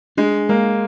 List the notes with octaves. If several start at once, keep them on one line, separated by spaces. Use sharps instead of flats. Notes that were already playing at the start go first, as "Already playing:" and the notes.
G#3 D4
G#3 A#3